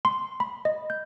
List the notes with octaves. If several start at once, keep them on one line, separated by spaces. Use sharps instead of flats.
C6
B5
D#5
G6